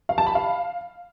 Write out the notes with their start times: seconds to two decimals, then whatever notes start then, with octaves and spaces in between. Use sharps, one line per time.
0.09 F5
0.18 A5
0.27 B5
0.35 F5